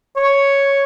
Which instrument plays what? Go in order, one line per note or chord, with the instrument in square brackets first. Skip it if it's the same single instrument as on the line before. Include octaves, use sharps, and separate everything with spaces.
[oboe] C#5